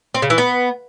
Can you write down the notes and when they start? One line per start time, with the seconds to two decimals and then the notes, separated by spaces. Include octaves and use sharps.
0.14 C4
0.22 C#3
0.30 E3
0.38 B3